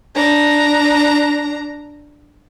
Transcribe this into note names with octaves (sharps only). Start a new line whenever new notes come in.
D4 A#5